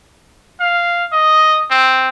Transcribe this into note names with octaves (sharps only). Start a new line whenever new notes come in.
F5
D#5
C4